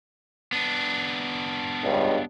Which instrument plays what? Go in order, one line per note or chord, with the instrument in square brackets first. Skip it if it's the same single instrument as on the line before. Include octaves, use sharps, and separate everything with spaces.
[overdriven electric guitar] B3 D4
[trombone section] C#2 G2